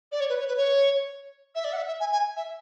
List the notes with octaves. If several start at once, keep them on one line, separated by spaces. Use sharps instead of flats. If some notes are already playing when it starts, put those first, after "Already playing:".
D5
C#5
B4
C#5
B4
C#5
E5
D5
F#5
E5
E5
G#5
G#5
E5